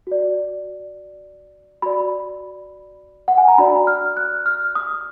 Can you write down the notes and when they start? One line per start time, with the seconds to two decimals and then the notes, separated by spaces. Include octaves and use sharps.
0.07 F#4 D5
1.82 F#4 D5 B5
3.28 F#5
3.38 G#5
3.48 A#5
3.58 D4 F#4 D5 B5
3.87 F6
4.17 F#6
4.46 F6
4.75 D#6